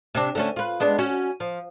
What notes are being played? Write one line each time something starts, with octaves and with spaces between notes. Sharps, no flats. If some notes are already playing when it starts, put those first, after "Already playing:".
C3 C4 D4
D3 A3 C#4
F4 B4
G#3 B3 D4
C#4 F#4
F3